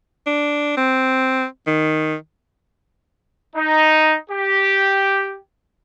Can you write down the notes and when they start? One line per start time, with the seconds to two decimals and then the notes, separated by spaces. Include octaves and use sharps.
0.27 D4
0.77 C4
1.67 D#3
3.55 D#4
4.30 G4